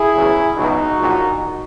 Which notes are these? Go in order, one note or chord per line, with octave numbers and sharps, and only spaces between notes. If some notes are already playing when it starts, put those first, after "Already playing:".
Already playing: E4 G#4
E2 C#3 F#3
C#2 B2 F#3 D#4 F#4
A#1 A#2 F#3